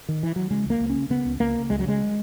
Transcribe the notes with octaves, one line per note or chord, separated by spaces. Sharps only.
D#3
E3
F#3
C#3 G#3
C#2 A#3
C#2
C#4
C#3
C#3 B3
C#2
C#2 A#3
C#3
C#2 G#3
F#3
C#3 G#3